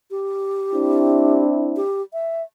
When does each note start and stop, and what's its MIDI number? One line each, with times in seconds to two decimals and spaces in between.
0.11 1.43 67
0.74 1.83 60
0.74 1.83 62
0.74 1.83 64
1.76 2.02 67
2.13 2.42 76